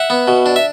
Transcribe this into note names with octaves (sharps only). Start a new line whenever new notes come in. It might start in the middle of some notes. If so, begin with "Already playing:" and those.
Already playing: E5 F#5
B3
B2
D4
E5